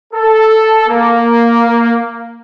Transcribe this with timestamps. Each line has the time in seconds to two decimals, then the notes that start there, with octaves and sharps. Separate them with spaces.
0.13 A4
0.88 A#3